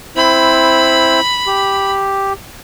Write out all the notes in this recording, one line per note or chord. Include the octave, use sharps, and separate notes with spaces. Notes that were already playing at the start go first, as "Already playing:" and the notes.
C4 E4 C5 B5
G4